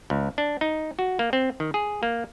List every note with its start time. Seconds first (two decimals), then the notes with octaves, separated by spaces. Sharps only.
0.10 C#2
0.38 D4
0.61 D#4
0.99 F#4
1.19 A#3
1.33 C4
1.60 D#3
1.74 G#4
2.03 A#3